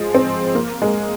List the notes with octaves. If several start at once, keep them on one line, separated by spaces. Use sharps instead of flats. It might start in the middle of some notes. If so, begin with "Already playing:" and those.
Already playing: F3 G#3
C4
A#3
G#3